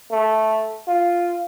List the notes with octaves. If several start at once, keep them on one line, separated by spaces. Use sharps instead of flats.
A3
F4